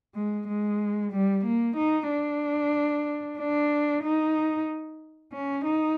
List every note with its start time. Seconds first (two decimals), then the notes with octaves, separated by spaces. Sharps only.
0.15 G#3
0.48 G#3
1.12 G3
1.45 A#3
1.77 D#4
2.10 D4
3.39 D4
4.04 D#4
5.33 C#4
5.65 D#4